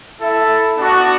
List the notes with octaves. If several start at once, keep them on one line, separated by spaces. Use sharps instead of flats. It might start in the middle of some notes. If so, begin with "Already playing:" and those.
E4 A4 E5
B3 D4 F#4 D5